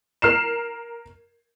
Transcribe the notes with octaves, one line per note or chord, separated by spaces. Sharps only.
A#4 F6 C7 E7